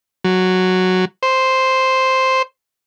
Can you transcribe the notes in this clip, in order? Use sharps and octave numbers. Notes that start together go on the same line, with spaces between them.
F#3
C5